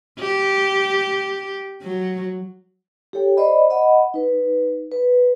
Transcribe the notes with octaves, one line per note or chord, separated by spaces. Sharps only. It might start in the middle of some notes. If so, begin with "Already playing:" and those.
G4
F#3
G4 A4 C#5 G5
C5 D5 D#5 B5
D#5 F#5 B5
D#4 B4
B4